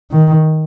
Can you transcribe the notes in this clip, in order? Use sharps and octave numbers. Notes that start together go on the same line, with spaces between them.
D#3